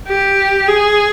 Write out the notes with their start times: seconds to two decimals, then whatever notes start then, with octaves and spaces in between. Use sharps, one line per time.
0.08 G4
0.68 G#4